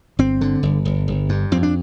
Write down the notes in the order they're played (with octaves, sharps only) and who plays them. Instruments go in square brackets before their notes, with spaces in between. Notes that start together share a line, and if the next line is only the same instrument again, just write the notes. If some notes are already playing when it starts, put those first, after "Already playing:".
[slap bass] G1 C4
D3
G1
G1
G1
G2
F2 C4
D4